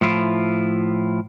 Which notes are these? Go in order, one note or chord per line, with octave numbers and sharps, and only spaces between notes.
A2 F3 E4 F4